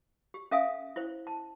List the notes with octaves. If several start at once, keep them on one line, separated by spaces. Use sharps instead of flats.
G4
C#4 A4 E5 F5 G#5 D#6
E4 C5
A5